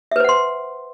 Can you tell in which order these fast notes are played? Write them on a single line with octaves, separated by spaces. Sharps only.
E5 B4 C5 F#5 C6